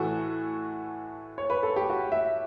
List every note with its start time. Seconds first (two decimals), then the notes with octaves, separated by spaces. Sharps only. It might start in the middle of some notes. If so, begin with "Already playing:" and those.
Already playing: A2 E3 A3 F#4
1.38 C#5
1.50 B4
1.63 A4
1.76 G4
1.90 F#4
2.12 E5